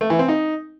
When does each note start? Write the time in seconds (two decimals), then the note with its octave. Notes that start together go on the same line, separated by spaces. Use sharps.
0.01 A3
0.10 E3
0.19 C4
0.28 D#4